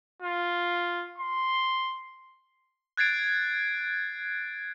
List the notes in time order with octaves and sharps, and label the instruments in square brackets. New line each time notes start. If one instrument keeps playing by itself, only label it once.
[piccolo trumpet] F4
C6
[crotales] F#6 G#6 A6 C7 D7